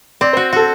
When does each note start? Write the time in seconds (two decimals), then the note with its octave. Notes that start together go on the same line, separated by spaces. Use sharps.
0.21 C4 D5
0.33 C5
0.37 F#4
0.53 F#4 A4